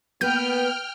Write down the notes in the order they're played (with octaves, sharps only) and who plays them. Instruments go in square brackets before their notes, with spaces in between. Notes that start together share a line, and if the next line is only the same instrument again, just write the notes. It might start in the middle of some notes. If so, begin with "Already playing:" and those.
[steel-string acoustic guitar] A#3 B4 [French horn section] B3 [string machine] G5 F6 [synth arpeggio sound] G6